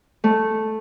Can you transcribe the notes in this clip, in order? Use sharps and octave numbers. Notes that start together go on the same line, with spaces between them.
A3